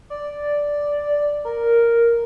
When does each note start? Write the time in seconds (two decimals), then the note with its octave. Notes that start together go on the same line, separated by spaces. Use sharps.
0.10 D5
1.45 A#4